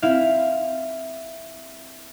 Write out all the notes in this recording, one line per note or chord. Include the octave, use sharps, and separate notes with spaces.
C4 E4 E5 F5